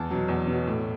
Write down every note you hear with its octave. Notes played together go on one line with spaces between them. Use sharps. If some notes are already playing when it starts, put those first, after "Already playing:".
Already playing: E2 A5
B2 F#3
E2
B2
F#3
A2